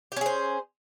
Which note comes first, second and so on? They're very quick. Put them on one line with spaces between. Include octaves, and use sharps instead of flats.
G4 C#4 G#4 C5